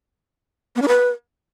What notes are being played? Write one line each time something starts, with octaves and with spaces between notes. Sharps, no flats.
B3
D4
B4